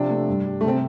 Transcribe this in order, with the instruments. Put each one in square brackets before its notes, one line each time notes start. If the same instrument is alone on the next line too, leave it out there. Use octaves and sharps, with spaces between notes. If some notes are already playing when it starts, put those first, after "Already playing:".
Already playing: [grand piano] C3 F3 [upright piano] D4
[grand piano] A3
G2
G3
[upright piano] A3
[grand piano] C3 [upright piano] C4